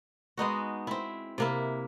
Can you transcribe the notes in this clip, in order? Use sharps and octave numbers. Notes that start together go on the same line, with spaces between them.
G#3 B3 D#4 F#4
C4 E4
C3 A#3 E4